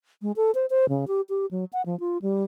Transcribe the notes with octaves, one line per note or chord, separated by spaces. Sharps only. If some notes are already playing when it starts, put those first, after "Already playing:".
G#3
A4
C5
C5
C#3
G4
G4
F#3
F#5
F3
F4
G3